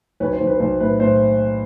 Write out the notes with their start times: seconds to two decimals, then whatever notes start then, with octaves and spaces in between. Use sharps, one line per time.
0.20 B1 B4 C#5
0.33 C5
0.41 B1
0.47 B4
0.60 B1 C5
0.80 A2 B4
1.00 A2 C5